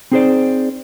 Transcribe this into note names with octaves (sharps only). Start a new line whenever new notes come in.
C4 D#4 G#4 A#4 C5 D5